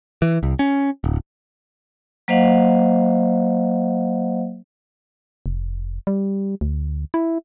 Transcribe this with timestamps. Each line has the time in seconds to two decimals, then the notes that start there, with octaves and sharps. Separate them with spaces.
0.22 E3
0.43 C2
0.59 C#4
1.04 D1
2.28 F#3 A#3 C5 D#5 F5 F#5
5.46 F1
6.07 G3
6.61 D2
7.14 E4